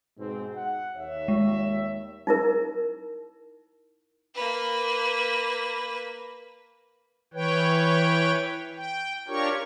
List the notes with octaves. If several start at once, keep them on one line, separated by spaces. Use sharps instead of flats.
G#2 B2 C4
F#5
D#2 C#5 E5
G#3
D#4 E4 A#4
A#3 B4
E3 B4 C#5 G5
G5
D4 F4 G4 A#4 C#5 C#6